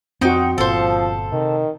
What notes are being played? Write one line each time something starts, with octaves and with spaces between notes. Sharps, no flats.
F2 C4 D#4 F#4 G5
G1 A#2 F3 A4 C5
C3 D#3